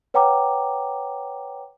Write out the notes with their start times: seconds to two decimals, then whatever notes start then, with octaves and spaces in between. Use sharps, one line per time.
0.14 B4 C#5 F#5 G5 A#5 D6